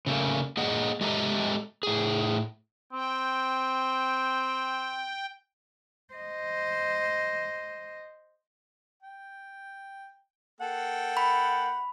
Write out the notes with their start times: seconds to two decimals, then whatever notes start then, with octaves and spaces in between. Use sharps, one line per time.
0.06 C#3 A3 A#3
0.57 A#3 G#4 D#5 F#5
1.01 G#3 G4 A4 D#5 E5 A#5
1.83 A2 G#4
2.92 C4 G5
6.14 C5 D#5
9.02 G5
10.61 A#3 A4 F#5 G5
11.17 B5